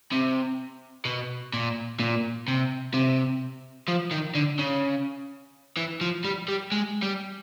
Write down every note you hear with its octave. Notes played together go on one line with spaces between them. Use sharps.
C3
B2
A#2
A#2
C3
C3
F3
D#3
D3
C#3
E3
F3
G3
G3
G#3
G3